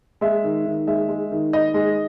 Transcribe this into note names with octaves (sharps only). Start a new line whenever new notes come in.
G#3 E5
D#3
D#3
G#3 E5
G#3
D#3
D#3 D#5
G#3